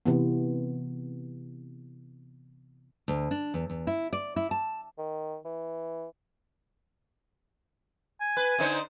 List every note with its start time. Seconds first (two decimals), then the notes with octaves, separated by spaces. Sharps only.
0.06 C3 E3 B3
3.08 D2
3.31 D4
3.54 E2
3.70 E2
3.87 E4
4.13 D5
4.36 E4
4.51 A5
4.98 D#3
5.45 E3
8.21 G#5
8.37 B4
8.59 D3 D#4 C5